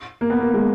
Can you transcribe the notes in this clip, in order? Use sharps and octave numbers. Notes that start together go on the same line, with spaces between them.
A#3
B3
A#3
G#3